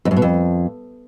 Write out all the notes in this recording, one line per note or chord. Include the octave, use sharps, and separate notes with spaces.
F2
F#2
B2
F2